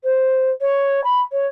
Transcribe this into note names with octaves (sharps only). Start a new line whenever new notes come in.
C5
C#5
B5
C#5